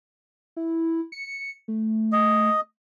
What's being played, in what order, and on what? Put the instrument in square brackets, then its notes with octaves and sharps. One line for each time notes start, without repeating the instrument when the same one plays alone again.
[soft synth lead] E4
C#7
A3
[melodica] D#5